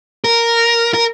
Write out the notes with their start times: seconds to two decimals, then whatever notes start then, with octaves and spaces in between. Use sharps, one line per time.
0.24 A#4
0.94 A#4